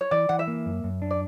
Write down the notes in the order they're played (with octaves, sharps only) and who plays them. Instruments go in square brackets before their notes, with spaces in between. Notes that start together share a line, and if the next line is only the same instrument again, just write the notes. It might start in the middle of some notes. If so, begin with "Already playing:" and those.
[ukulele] C#5
[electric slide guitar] E3 [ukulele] D5
[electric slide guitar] E3 [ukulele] F#5
[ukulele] E5
[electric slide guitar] A#3
F#2
F#2
D4
[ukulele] D5